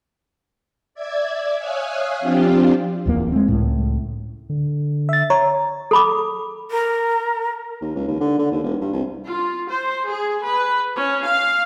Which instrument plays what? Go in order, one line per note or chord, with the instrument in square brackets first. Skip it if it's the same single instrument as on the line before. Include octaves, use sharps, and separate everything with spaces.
[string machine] D5 E5 G#6
C#5 E5 F5 G#5 D#6 F#6
F3 C4 D4 F4 G4
[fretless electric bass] D1 E2 A#3
G#3 C4
C#2 A2
[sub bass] D3
[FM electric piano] E5 A6
[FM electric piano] C#5 [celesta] A#5
[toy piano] A4 B5 D6
[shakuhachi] A#4
[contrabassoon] D#2
C#2
D#2
D3
D3
D#2
E1
G2
C2
[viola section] F4
C5
G#4
B4
C#4
F5